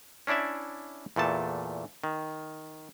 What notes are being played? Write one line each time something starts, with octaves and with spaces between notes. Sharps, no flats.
C#4 D4 E4 D5 E5
E2 A#2 A3 A5
D#3